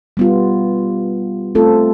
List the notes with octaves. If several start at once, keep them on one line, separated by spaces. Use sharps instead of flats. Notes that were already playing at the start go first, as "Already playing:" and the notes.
G3 B3 F4
A3 C4 F4 A4